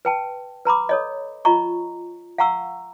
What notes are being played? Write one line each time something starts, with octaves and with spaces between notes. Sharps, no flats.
B4 G5 A5
B4 A#5 B5 D6
A4 C#5 D#5
F4 D#5 A#5 C#6
F5 F#5 A#5 C#6 E6